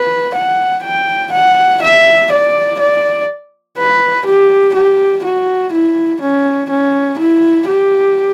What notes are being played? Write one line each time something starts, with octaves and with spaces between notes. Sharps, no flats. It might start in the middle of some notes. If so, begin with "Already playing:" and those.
Already playing: B4
F#5
G5
F#5
E5
D5
D5
B4
G4
G4
F#4
E4
C#4
C#4
E4
G4